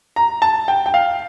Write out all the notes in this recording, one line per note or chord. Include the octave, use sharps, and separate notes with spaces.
A#5
A5
G5
G5
F5